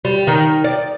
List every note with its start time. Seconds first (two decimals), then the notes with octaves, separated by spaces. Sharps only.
0.05 G3
0.27 D#3
0.64 D5